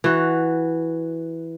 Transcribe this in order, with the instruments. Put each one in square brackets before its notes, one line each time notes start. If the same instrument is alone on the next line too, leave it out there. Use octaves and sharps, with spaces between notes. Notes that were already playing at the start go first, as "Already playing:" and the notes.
[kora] E3 F#4